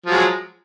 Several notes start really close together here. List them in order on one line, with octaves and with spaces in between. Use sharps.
F3 F#3 G#3